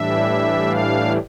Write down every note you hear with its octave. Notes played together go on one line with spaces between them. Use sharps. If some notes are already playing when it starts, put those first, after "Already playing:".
Already playing: A2 E3 G3 D4 E5
F5